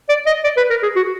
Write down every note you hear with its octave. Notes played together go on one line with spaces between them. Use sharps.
D5
D#5
D5
B4
A#4
G#4
F#4